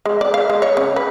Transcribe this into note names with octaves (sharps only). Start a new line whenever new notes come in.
G#3
D5
F5
G#3
C#5
C#3
B4